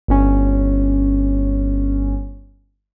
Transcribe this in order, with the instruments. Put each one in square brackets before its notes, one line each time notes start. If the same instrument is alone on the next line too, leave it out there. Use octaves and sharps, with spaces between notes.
[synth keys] G1 C#4